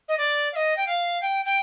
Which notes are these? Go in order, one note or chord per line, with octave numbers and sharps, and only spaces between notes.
D#5
D5
F5
D#5
G5
F5
G5
G5